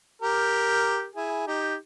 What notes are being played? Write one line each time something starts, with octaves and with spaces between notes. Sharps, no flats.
G4 A#4
E4 G#4
D#4 G4